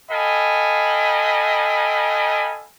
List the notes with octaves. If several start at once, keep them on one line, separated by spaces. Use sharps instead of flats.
A4 D#5 F5 G5 G#5 B5